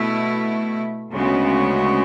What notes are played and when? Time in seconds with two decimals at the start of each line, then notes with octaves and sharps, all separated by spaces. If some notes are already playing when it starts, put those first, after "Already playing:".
Already playing: B2 A3 E4
1.12 D2 C#3 G#3 B3 F#4